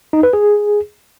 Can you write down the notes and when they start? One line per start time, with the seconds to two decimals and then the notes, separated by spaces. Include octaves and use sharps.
0.13 D#4
0.23 B4
0.33 G#4